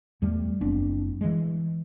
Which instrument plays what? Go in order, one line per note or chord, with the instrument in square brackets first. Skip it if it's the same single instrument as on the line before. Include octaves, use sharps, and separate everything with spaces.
[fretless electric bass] E2 G3 A3
F#1 B3 C4 D4
E3 G#3